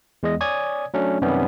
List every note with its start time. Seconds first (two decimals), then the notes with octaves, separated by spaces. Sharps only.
0.23 E2 G#3 D#5
0.41 C#5 D5 G#5 D#6 G#6
0.94 F#3 A3 C#4 D4
1.22 F#2 C3 D#3 G3 B3 C#4